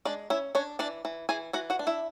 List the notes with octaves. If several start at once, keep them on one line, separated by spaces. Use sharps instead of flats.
G#3 D4 D5
C#4 E4 E5
C#4 D4 C#5
E3 D4 D5
E3
E3 G#4 G#5
E3 F#4 F#5
F#4 F#5
D4
E4 E5